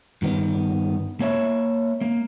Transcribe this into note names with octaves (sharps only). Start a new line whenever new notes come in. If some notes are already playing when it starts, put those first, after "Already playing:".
G2 D#3 B3
A#3 C#5 E5
A#3